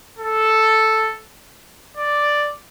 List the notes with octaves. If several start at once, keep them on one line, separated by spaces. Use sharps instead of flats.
A4
D5